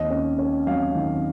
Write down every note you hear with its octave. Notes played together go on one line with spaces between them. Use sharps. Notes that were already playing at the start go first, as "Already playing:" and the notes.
Already playing: D#2 D#5
C#4
C#4
F#3 F5
D#3